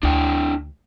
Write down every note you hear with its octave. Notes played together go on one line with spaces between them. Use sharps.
D2 D4 E4 G5